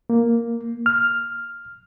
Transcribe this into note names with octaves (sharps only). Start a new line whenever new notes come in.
A#3
F6